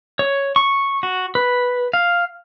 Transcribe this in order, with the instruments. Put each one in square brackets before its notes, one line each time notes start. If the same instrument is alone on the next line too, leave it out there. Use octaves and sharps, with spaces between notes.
[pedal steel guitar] C#5
C#6
F#4
B4
F5